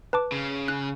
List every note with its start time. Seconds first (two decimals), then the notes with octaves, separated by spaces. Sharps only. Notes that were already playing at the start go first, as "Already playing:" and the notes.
0.13 B4 A5 D6
0.32 C#3
0.68 F#6